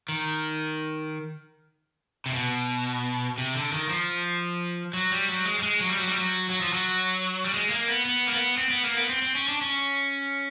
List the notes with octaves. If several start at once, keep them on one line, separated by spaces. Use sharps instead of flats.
D#3
C3
B2
C3
D3
D#3
F3
F#3
G3
F#3
G#3
G3
G#3
F#3
G3
F#3
G3
F#3
F#3
F3
F#3
G3
G#3
A#3
B3
B3
A#3
B3
C4
B3
A#3
B3
C4
C4
C#4
D4
C#4